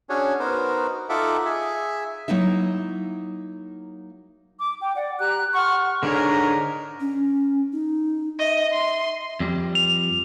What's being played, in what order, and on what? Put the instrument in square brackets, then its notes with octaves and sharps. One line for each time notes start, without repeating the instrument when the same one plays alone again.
[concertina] C#4 D4 F#4 G#4 C#5
B3 D#4 F#4 A#4 C5
D#4 F4 A4 E5 F#5 D6
G#4 E5
[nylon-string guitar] F#3 A#3 D#4 E4 E5
[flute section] D6
G5
D5 F#5
G4 A#5 F#6
F#5 C6 C#6 F6
[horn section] G#2 A#4 [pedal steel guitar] D3 D4 C#5
[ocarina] C#4
D#4
[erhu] D#5 [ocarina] E5
[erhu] C6
[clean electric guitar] F2 G3
[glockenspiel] F7